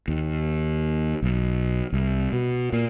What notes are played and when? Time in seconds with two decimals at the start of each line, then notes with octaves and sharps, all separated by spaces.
0.08 D#2
1.23 B1
1.93 C2
2.32 B2
2.73 A#2